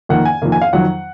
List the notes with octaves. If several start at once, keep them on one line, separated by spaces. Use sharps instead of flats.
F2 D#3 A#3 F#5
G#5
F2 D#3 A#3
G#5
F5
F2 D#3 F#3 F#5